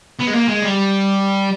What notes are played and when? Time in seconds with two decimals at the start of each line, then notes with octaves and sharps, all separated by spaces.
0.19 B3
0.27 G#3
0.33 A#3
0.48 G#3
0.62 G3